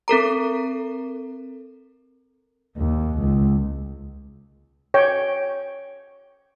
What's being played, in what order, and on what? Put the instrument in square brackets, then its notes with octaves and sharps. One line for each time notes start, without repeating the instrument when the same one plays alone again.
[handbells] C4 A4 A#4 A#5
[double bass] D#2
C#2
[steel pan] C#5 G5